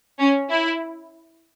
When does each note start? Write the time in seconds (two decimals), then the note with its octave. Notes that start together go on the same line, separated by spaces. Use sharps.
0.19 C#4
0.49 E4